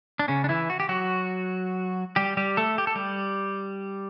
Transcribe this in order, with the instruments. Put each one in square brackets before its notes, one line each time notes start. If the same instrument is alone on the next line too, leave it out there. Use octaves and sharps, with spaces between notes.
[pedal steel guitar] D4
C#3 C#4
D4
E3 E4
F#4
G4
F#3 F#4
G3 G4
G3 G4
A3 A4
G4
A4
G3 G4